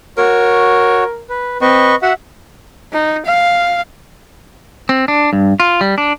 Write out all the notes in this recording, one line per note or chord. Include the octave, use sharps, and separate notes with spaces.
F#4 A#4 C#5
B4
C4 B4 D#5 C#6
F#4 E5 F#5
D#4
F5
C4
D4
G2
F4
G3
D4